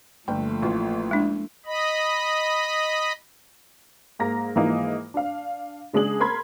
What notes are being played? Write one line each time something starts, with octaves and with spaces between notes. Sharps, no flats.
G1 F3 A3 A#3 G5
A1 F4
G#3 D4
D#5 B5
G#2 A#3 A#5 A#6
G#2 E3 F3 A#3 D#4
D4 F5
C#3 G#3 D4 G#4 F#7
A#4 B5 C6 G#6